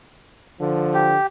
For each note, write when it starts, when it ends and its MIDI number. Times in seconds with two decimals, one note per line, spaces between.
0.60 1.15 50
0.60 1.15 53
0.94 1.27 67